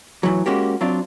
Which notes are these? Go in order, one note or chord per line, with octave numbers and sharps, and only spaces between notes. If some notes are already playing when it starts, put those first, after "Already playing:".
A2 E3 F#3
G#3 A#3 C#4 F#4 G4
F#3 C4 D4 F4